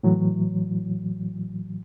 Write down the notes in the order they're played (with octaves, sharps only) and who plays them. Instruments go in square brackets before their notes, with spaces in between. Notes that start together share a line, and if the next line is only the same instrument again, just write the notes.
[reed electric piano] A2 E3 F#3